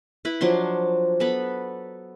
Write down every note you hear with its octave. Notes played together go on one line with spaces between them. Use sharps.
E4 B4 B5
F3 F#3 D4 C6
B3 A4 B5